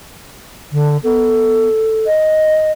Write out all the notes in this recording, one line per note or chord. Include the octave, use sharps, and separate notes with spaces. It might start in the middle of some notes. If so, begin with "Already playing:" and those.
D3
B3 A4
D#5